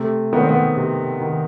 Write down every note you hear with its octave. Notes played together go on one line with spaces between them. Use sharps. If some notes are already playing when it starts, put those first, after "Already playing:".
Already playing: C3 A3
D#3 B3
C4
B3
C3
D#3